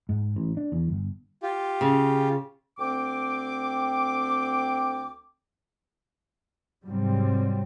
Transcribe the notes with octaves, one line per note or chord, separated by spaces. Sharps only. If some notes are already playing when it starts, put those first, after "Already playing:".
G#2
A1
D4
E2
G1
F4 G4
C#3
D2 C4 G5 D6
G#2 C3 F#3 G3 C4